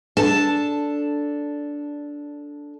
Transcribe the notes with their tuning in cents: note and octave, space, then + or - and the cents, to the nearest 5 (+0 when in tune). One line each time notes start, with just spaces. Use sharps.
D4 -10 A4 +0 A5 +0